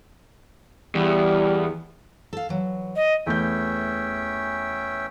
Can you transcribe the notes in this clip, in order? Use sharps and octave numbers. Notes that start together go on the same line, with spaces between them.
E2 G3
A4 F5
E3 F#3
D#5
E2 A3 C#4 E5 G5 G6